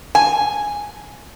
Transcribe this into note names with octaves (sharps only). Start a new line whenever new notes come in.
G#5